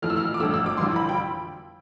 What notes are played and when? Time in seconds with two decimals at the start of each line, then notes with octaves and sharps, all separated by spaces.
0.02 F2 E3 A3 F6
0.10 E6
0.17 F6
0.34 D6
0.40 G1 F2 D3 A3 E6
0.54 E6
0.66 D6
0.77 G1 F2 E3 G3 C6
0.96 B5
1.09 G5